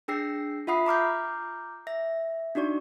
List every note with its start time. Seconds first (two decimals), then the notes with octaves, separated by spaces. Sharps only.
0.08 D4 G#4 G5 E6 A#6 C7
0.67 F4 E5 F#5 B5 D#6 C7
0.86 A#5 D6 F6 G6
1.87 E5 A#6
2.55 D4 D#4 F#4 D5 C#6